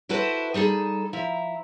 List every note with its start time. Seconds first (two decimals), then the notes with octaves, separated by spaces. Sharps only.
0.09 E4 F#4 A4 B4 C5
0.54 G3 D#4 G#4 A4
1.13 F3 E4 A#5